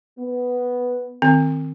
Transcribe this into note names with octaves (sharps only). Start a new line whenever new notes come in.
B3
D#3 C4